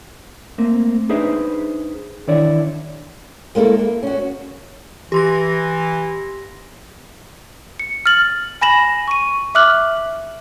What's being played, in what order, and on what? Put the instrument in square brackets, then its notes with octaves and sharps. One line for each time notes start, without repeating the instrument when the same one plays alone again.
[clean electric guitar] A3 A#3 C4
D4 D#4 G#4 B4 C5 E5
D#3 E3 D4 E4 C#5 D5
[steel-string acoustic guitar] G#3 A#3 D4 E4 A4
A#3
C#4 F#4
[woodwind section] E3 [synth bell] G4 C6 A#6
[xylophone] C#7
F6 A6 F#7
G#5 B5 A#6 E7 F#7
C#6 D#7
E5 D6 F6 F#6 F#7